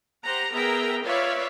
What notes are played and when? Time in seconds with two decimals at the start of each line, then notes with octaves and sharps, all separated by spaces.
0.23 G4 C5 F#5 A#5
0.52 B3 G#4 A#4 E5 G5 A#5
1.05 F4 B4 C#5 D5 E5 F5